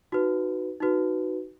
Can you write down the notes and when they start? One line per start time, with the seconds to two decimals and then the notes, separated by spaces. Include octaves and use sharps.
0.12 D#4 F#4 B4
0.80 D#4 F#4 B4